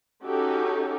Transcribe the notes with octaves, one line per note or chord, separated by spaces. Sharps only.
C#4 D#4 F#4 G4 A4